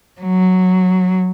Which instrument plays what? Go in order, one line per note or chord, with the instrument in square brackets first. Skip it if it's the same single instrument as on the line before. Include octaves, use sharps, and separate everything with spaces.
[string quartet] F#3